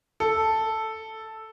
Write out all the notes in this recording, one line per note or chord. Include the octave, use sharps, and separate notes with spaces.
A4